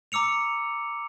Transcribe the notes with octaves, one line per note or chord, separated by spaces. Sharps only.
A#5 D6 E6 C#7 F7